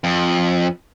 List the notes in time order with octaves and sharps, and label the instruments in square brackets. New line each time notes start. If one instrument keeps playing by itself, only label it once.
[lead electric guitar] F2